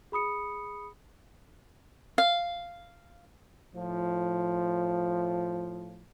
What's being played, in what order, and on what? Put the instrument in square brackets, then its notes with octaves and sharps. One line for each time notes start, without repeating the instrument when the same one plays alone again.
[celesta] G#4 B5 D#6 C#7
[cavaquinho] F5
[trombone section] A2 F3